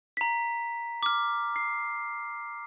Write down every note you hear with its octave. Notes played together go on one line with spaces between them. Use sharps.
A#5 B6
D6 F6
C7